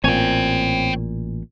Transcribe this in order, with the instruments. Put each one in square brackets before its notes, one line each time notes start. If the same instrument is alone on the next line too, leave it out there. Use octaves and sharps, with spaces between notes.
[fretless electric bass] A1 A#2 [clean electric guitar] C4 G#5 [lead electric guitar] C#5 G5